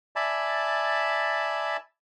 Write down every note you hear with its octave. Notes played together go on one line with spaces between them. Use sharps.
D5 E5 G#5 A5 B5